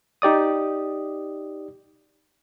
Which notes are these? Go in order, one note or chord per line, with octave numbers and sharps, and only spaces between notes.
D#4 G4 D5 D#6